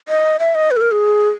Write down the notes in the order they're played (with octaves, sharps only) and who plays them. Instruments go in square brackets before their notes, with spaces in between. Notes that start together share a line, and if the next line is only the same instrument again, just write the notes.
[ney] D#5
E5
D#5
B4
A4
A#4
G#4